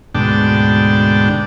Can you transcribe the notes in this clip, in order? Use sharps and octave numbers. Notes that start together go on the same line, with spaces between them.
D2 G#2 B2 D4 G5 A5